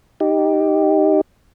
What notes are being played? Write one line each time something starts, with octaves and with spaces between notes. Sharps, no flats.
D#4 G4